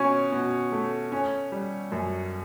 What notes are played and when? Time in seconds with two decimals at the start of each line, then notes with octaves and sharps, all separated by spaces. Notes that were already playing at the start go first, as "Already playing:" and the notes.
Already playing: B2 C#4 C#6
0.32 B2
0.72 A3
1.12 C#4
1.52 G3
1.92 F#2